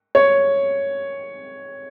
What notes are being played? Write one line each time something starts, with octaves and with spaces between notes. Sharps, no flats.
C#5